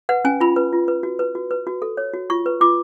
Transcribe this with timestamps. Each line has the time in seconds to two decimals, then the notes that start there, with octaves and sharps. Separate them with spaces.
0.09 B4 F#5
0.25 C#4 G#5
0.40 F4 B5
0.56 B4
0.73 F4
0.88 B4
1.03 F#4
1.19 B4
1.35 F#4
1.51 B4
1.67 F#4
1.82 A4
1.97 C#5
2.13 F#4
2.30 F4 C#6
2.46 B4
2.61 F4 D6